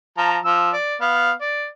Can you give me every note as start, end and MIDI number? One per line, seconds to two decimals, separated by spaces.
0.18 0.38 53
0.18 0.38 81
0.18 0.38 82
0.45 0.71 53
0.45 0.71 88
0.73 0.95 74
1.01 1.32 59
1.01 1.32 77
1.41 1.67 74